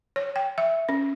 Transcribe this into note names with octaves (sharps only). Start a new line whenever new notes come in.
C#5
G5
E5
C#4